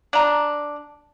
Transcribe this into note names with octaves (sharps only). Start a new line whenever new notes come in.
D4 A#5